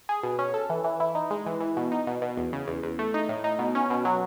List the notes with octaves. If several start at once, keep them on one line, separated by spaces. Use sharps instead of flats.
G#4
B2
C#4
A4
E3
E3
E4
D#4
G#3
E3
E3
B2
D#4
B2
B2
E2
C#3
E2
E2
A3
D#4
A2
D#4
B2
C#4
B2
F#3